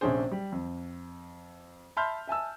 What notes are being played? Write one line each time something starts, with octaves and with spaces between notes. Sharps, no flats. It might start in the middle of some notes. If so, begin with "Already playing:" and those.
A#1 C3 C#4 D4 G#4 C5
G3
F2
E5 A5 B5 C6 F6 G6
E5 G#5 A5 E6